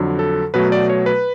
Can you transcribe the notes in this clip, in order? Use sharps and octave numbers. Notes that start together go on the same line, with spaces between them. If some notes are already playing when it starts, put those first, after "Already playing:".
Already playing: F2 D3 F#3
A4
B2 F#3 A3 B4
D5
C#5
B4